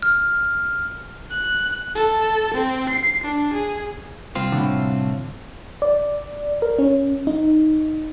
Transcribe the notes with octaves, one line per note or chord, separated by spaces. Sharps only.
F6
F#6
A4
C4
C7
D4
G#4
C2 C4 F4
A2 D3
D5
A#4
C#4
D#4